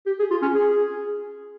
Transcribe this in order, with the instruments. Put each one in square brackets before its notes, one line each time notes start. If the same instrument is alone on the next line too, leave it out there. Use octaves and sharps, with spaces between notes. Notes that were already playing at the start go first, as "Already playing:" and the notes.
[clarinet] G4
G#4
F4
C#4
G#4